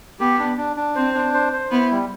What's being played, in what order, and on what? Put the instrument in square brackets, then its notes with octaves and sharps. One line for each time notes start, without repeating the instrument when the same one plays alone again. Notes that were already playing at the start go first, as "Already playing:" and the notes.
[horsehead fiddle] B3 [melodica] G4
[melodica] D4
D4
D4
[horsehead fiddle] C4 [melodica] C5
[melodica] D4
C5
C5
[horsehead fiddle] B3 [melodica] E4
[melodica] G3